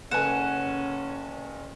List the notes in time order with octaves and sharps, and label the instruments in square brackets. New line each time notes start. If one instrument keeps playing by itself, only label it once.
[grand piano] F#1 G#5 [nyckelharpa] C#4 [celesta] A4 B4 E7 [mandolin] F#5